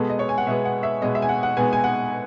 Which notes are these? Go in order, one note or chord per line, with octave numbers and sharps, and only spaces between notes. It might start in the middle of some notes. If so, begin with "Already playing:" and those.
Already playing: B2 G#3 B3 A4
D#5
C#5
G#5
F#5
B2 G#3 B3 E5
F#5
E5
B2 G#3 B3 D#5
E5
G#5
F#5
F#5
B2 G#3 B3 G#5
G#5
F#5